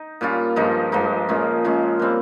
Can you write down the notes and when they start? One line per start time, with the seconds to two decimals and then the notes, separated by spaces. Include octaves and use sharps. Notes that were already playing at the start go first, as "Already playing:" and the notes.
Already playing: D#4
0.21 A#2 G3 C#4 F4
0.56 G2 F3 G#3 D#4
0.92 G2 F3 G#3 D#4
1.28 A#2 G#3 C#4
1.64 A#2 G#3 C#4
1.99 A#2 G3 C4